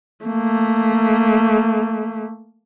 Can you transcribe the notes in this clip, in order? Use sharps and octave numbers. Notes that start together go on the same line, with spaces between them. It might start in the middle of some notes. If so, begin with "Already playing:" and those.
A3 A#3